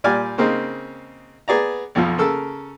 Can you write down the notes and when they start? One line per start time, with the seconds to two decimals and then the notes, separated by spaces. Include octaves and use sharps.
0.04 A#2 G3 G4 D5 G#5 F6
0.38 C#3 A#3 C4 D#4
1.48 B3 G#4 D5 A#5
1.95 B1 F2 F3
2.18 C#3 A4 A#4 E6